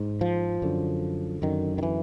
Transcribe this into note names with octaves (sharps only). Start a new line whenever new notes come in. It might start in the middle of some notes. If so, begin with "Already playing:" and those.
Already playing: G#2
F3
F#2 D3
F#2 D3 D#3
D#3
E3